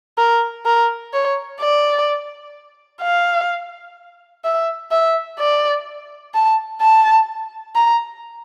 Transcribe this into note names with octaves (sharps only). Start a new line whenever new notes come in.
A#4
A#4
C#5
D5
F5
E5
E5
D5
A5
A5
A#5